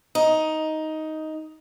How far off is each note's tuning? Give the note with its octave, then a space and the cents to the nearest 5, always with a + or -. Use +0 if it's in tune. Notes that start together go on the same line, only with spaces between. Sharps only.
D#4 +10